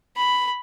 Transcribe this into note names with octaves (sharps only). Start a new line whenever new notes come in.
B5